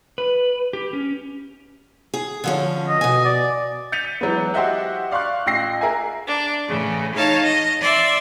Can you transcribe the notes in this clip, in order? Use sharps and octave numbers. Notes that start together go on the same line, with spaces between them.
B4
G4
C#4
G#4
D3 F3 C#4
D#5
B2 G#5
D5
G6 A6 B6 C#7 D#7 F7
E3 F#3 G#3 B3
F#4 G4 C5 D#5 E5 F#5
D5 F5 C6 C#6 F#6
A1 F4 G5 E6 A#6 C7
G#4 A#4 E5 G#5
D4
A2 C#3 E3
D#4 C#5 F5 A5
D#5
D5 E5 C6